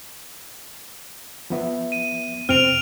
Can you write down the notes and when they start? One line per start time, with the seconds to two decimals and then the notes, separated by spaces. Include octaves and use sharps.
1.50 F3 B3 E5
1.92 D#7
2.49 F2 C3 C4 F6 D7 F7